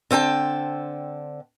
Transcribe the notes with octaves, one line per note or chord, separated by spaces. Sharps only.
D3 C4 G5 A5